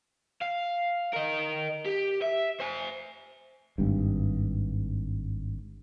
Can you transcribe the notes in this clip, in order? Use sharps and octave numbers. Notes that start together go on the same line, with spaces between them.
F5
A#4 D#5
G4
E5
C5 G#5
G#1 G2